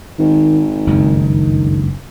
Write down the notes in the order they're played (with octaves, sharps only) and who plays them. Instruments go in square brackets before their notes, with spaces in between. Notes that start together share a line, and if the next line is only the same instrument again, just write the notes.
[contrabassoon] G#1 [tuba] D#3
[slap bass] F#1 C#2 G2 [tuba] D#3